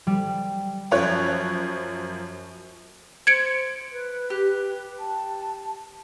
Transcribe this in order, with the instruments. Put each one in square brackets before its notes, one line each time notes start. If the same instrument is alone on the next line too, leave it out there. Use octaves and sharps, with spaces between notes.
[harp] G3
[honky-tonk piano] F#2 F3 C#5 F#6
[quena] C5 [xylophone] G#6 C#7 D7
[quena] B4
[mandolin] G4
[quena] A5